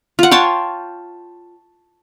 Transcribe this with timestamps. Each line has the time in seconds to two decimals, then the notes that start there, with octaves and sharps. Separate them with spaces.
0.19 F4 F#5
0.31 C#5 G5 A5 C6